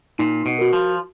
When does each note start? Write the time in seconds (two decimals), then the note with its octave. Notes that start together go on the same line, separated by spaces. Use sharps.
0.19 A#2 D#4
0.46 B2
0.59 F#4 A#4
0.73 F3